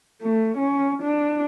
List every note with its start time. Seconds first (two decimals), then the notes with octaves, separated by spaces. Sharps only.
0.22 A3
0.57 C#4
1.02 D4